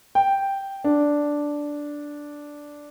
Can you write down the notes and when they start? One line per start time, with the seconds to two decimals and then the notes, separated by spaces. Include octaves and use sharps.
0.15 G5
0.84 D4